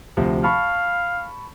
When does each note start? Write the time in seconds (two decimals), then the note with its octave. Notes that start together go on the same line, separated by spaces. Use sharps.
0.17 D2 C3 F3
0.44 F5 A5 B5 C#6